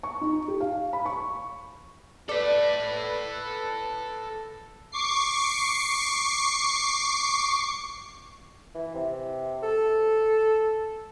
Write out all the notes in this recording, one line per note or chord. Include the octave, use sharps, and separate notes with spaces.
C#6
D#4
G4
F5
B5
C#6
A4 B4 D5 B5
C#6 D6 C7
E3
C3
A4